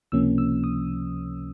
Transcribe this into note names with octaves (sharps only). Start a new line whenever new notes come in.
C#2 C3 F3 A#3 C#4 E6
E6
D#6